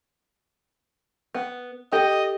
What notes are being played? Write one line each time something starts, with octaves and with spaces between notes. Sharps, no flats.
B3
G4 A4 D#5